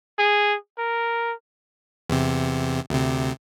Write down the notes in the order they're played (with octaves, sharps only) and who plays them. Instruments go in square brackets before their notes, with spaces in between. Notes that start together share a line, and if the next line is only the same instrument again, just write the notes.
[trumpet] G#4
A#4
[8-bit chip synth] E2 C3
D2 C3